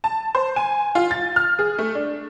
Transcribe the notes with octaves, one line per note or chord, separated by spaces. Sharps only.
A5
C5
G#5
F4
A6
F6
G#4
A3
D4